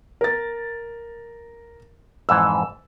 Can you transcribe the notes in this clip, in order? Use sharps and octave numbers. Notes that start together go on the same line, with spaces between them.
A#4 A6
F2 G#2 E3 E6